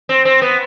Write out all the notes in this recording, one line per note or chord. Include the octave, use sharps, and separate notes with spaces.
C4
C4
B3